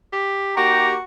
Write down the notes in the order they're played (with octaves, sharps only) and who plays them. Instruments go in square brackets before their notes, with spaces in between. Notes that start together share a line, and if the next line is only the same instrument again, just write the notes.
[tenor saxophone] G4
[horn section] A#3 D#4 G4 [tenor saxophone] F#4 [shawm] A#5